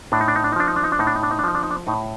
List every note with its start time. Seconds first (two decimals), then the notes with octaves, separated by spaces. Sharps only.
0.12 A2 D4
0.21 D#4
0.28 D4
0.35 D#4
0.44 D4
0.52 D#4
0.56 F3 D4
0.67 D#4
0.76 D4
0.84 D#4
0.92 D4
0.99 A2 D#4
1.07 D4
1.16 D#4
1.23 D4
1.31 D#4
1.39 D4
1.44 F3 D#4
1.55 D4
1.63 D#4
1.71 D4
1.87 A2 D#4